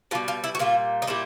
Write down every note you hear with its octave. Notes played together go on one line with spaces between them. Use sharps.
B2 G3 F4
F4
E4
F#4
A#2 G3 F4
D#4
A#2 G3 E4